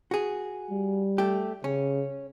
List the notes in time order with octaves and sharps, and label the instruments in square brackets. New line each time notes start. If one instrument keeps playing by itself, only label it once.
[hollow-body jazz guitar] F#4 G#4
[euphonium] G3
[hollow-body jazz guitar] A3 G4
[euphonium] C#3 [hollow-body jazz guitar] C#4